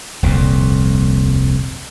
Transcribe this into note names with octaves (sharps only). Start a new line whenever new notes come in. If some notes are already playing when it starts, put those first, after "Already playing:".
D#1 C2 F2 A#2